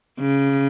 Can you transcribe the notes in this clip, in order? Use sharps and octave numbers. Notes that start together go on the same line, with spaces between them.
C#3